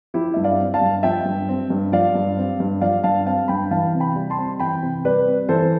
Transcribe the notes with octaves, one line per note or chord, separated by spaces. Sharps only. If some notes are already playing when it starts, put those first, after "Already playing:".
F3 E4 G4
G2 E5
D5 F5
C4
F5 A5
G2
F3 E5 G5
G2
C4
G2
F3 D5 F5
G2
C4
G2
F3 D5 F5
G2 F5 A5
C4 F5 A5
G2 G5 B5
E3 F5 A5
C3
G5 B5
G3
A5 C6
C4
E3 G5 B5
C3
G3 B4 D5
C4
E3 A4 C5